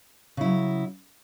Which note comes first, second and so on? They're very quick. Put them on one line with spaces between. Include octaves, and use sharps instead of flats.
C#3 E4 F#3